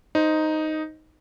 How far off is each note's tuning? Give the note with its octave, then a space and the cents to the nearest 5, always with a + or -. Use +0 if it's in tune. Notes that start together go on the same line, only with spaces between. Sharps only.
D#4 +0 C5 +0